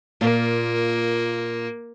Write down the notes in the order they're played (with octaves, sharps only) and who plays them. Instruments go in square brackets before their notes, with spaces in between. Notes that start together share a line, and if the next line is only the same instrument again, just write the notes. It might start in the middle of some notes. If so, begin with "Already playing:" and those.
[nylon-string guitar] A#2 F4 [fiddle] A#3